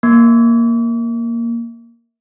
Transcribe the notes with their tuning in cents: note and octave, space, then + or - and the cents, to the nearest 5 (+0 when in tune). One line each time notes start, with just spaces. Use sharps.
A#3 +0 D6 -45